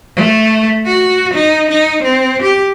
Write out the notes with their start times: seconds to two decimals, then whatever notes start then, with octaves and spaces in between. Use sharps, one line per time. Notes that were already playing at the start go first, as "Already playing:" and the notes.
0.16 A3
0.85 F#4
1.34 D#4
1.70 D#4
2.03 C4
2.42 G4